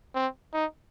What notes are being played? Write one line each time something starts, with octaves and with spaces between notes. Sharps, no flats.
C4
D#4